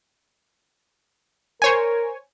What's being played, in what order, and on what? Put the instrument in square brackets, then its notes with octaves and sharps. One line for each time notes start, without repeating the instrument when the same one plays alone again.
[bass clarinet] A#4 [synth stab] C5 C#5 G#5